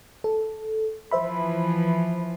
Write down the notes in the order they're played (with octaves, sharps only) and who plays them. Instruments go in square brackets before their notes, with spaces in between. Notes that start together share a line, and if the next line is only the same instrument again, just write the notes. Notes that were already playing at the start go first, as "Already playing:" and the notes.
[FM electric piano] A4
[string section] E3 F3 [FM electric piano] C5 E5 B5